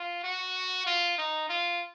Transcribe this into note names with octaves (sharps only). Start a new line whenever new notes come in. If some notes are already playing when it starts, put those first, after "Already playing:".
Already playing: F4
F#4
F4
D#4
F4